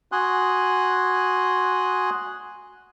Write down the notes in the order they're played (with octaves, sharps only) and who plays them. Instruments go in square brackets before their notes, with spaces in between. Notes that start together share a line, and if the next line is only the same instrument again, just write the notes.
[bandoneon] F#4 G#5 C6 D#6 F#6